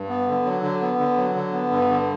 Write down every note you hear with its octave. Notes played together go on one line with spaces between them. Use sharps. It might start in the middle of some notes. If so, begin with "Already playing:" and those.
Already playing: G2
B3
D3
F#3
D3
B3
D3
F#3
D3
B3
G2
D3